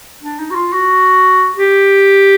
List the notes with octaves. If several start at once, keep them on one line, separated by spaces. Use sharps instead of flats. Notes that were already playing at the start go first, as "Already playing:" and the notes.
D4
D#4
F#4
F4
F#4
G4